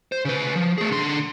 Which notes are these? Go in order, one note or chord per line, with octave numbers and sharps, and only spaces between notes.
C5
C#3 B4
F3
A3 G#4
D3 C6